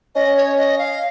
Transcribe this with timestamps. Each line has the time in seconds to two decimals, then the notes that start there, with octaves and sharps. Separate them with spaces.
0.15 C#4 D#5
0.37 C#5
0.57 D#5
0.78 F5